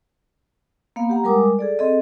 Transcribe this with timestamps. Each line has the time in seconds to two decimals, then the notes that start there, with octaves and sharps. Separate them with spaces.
0.96 A#3 B3 F5
1.09 G4 F#5 A#5
1.24 G3 G#3 A#4 G#5 D6 D#6
1.59 G#4 A4 D5
1.79 C4 G#4 A4 D#5